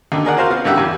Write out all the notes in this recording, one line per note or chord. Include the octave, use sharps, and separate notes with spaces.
D#2 D3
G#4 A#4 D5 F#5
F4 F#4 A#4 C5 F5
B3 F5
A1 D3 G3 G4 E5 F#5
E2